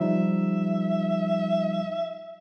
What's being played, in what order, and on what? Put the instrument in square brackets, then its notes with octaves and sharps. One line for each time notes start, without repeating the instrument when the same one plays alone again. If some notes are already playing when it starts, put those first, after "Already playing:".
[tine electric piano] F3 G3 D#4 [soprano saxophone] E5